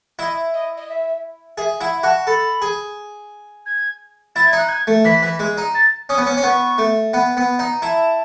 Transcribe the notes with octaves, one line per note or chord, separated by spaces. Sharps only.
E4 D#5
D#5
D#5
E5
G#4 E5
E4 F#5
F#4 A5
A4 B5
G#4
G#6
E4 A6
G#6
D#4 F#6
G#6
A3
E3 B6
E3
G#3
D#4
A6
C#4 D#6
B3
C#4
C#4
B3 C#6
A3
B3
B3
D#4
E4 A5